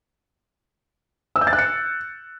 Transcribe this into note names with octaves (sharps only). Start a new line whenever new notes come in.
E6
G6
A6
F#6
C#7